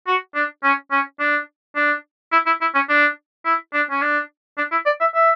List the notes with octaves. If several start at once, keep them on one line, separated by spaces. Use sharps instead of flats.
F#4
D4
C#4
C#4
D4
D4
E4
E4
E4
C#4
D4
E4
D4
C#4
D4
D4
E4
D5
E5
E5